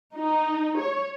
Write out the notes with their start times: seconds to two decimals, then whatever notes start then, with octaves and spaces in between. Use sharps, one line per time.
0.17 D#4
0.80 C#5